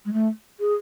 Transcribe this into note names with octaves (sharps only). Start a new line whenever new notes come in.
G#3
A3
G#4